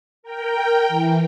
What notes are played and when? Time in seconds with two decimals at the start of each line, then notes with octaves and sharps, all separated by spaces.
0.23 A#4 G5
0.88 E3